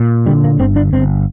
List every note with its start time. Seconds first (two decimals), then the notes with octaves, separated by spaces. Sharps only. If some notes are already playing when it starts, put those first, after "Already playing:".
Already playing: A#2
0.26 D3 G3
0.44 A#3
0.59 G1 C4
0.76 D4
0.93 G1 C4